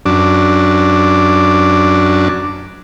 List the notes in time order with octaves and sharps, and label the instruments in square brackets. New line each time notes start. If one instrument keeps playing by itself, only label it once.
[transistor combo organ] F#2 D4